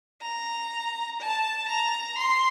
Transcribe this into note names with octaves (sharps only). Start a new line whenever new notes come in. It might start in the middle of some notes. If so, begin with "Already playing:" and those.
A#5
A5
A#5
C6